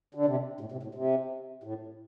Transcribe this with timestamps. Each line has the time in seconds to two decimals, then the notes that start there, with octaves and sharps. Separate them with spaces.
0.15 D3
0.26 C3
0.60 A2
0.72 C3
0.83 A2
0.95 C3
1.63 A2